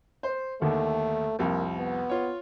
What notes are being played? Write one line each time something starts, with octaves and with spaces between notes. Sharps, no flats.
C5
D#2 D3 D#3 A3
C2 F2 A#3
B3
F4 C#5